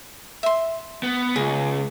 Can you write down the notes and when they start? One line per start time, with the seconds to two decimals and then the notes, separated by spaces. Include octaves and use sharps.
0.43 E5 C6
1.03 B3
1.36 C#2 G#4